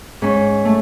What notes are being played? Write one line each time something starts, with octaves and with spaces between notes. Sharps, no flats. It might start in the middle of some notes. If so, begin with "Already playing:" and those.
G#2 C#4
A3